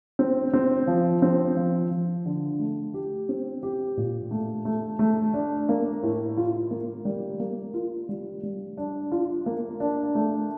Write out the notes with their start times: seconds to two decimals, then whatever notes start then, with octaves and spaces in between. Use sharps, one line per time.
0.19 C4
0.53 C4
0.87 F3
1.22 C4
1.57 F3
1.91 F3
2.26 D3
2.59 A3
2.94 G4
3.29 C4
3.63 G4
3.97 A#2
4.31 A3
4.65 A3
4.99 A3
5.34 D4
5.69 A#3
6.03 A2
6.37 F4
6.71 A#3
7.05 G3
7.40 A#3
7.74 F4
8.09 G3
8.43 G3
8.78 D4
9.12 F4
9.46 A#3
9.80 D4
10.15 A3